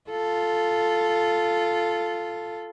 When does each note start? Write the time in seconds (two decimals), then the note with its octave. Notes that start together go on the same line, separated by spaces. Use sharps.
0.10 F4 A4